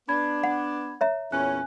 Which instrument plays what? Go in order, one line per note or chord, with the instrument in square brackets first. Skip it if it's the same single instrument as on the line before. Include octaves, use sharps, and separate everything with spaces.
[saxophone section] B3 D4 [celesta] B5 G#6
[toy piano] F#5
C#5 E5 A#5
[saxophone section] E2 A#2 C#4 [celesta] G#5 F#6